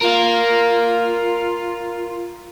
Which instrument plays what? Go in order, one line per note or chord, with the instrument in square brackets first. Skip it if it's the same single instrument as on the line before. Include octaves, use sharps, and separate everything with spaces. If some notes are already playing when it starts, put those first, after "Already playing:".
[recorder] F4 [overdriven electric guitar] A#4 F5